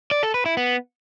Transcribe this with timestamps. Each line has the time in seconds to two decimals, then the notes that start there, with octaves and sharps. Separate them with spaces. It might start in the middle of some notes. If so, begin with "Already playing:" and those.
0.11 D5
0.23 A4
0.34 B4
0.46 E4
0.57 B3